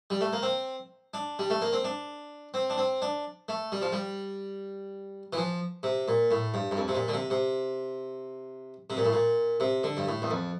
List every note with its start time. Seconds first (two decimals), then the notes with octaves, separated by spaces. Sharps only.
0.10 G3
0.21 A3
0.33 A#3
0.42 C4
1.14 D4
1.39 G3
1.50 A3
1.62 A#3
1.73 C4
1.85 D4
2.54 C4
2.70 D4
2.78 C4
3.02 D4
3.49 A3
3.72 G3
3.82 F3
3.92 G3
5.33 E3
5.37 F3
5.83 C3
6.08 A#2
6.31 A2
6.54 G2
6.71 G2
6.77 F2
6.88 C3
6.95 A#2
7.08 D3
7.14 C3
7.30 C3
8.90 C3
8.97 A#2
9.05 A2
9.13 A#2
9.60 C3
9.84 D3
9.97 G2
10.07 A2
10.22 E2
10.30 F2